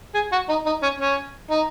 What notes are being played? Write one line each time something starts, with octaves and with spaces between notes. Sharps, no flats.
G#4
F#4
D#4
D#4
C#4
C#4
D#4